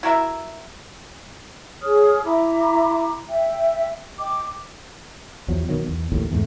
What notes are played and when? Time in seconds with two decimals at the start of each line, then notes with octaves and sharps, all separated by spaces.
0.03 E4 F#4 A#4 E5
1.82 G#4 C#5 D#6 F6
2.25 E4 A#5 D6
3.29 E5 G5
4.19 D#5 G5 D6
5.48 E2 F3 F#3
5.69 B2 D#3 F#3
5.88 E2
6.12 A#1 D#2 A2
6.32 E2 G#2 A3